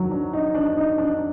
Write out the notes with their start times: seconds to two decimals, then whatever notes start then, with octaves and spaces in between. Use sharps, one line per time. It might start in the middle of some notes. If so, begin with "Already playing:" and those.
Already playing: D#3 F#3
0.11 D4
0.33 D#4
0.55 D4
0.77 D#4
0.98 D4